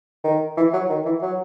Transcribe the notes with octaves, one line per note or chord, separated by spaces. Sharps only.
D#3
E3
F#3
D#3
E3
F#3